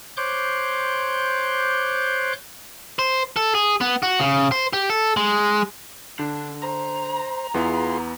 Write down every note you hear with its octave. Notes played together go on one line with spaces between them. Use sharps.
C5 C#5 C6 D6 F#6 G6
C5
A4
G#4
B3
F#4
C#3
C5
G4
A4
G#3
D3 D4
C5 A#5
E2 B3 E4 F4 G#4 C6